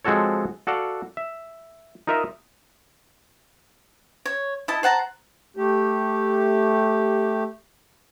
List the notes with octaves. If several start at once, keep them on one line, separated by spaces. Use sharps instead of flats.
F3 G#3 C4 F#4 A4 C#5
F#4 A4 D5 F5 F#5
E5
D#4 F4 A#4 D#5 E5
C#5
E4 D#5 A5
C5 F#5 A5 A#5
A3 G4